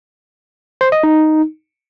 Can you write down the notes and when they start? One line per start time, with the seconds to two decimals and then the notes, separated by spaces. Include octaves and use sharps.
0.81 C5
0.92 D#5
1.03 D#4